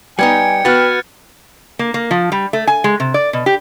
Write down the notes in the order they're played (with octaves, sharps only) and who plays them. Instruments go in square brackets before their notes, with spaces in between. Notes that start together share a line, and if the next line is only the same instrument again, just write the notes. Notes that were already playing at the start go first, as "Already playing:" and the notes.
[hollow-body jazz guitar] G3 B3 D#4 [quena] G5 [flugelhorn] G#5 [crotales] G#6 C#7
[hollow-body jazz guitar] B3 F#4 [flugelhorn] B4 [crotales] F6 F#6 A6
[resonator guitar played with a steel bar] A#3
A#3
F3
G3
A3
G#5
G#3
C3
D5
B2
G4